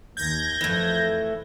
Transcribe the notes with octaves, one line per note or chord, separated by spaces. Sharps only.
D#2 G6 G#6 A#6
F2 E3 A3